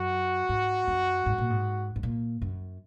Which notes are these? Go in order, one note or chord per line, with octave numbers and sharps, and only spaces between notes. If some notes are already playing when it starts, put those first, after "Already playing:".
Already playing: F#2 F#4
G#2
F#2
G#2
A#2
G#2
G#2
A#2
F#2